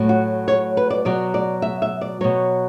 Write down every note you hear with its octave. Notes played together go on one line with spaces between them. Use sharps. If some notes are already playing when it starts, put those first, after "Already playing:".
Already playing: A2 F#3
F#4
C#5
B4
D5
B2 F#3 D5
D5
E5
E5
D5
B2 F#3 C#5